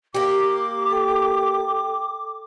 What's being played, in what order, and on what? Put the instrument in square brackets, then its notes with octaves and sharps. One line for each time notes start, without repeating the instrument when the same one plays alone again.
[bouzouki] A#3 G4 [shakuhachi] D6
[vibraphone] A4 G5